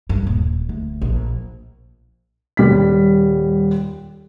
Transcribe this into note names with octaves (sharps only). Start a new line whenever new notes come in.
G2
D#1
D2
A#1
D#1 G3 B6